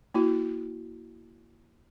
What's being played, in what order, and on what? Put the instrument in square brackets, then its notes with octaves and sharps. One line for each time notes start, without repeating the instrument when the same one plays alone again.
[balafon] A#3 E4 F#4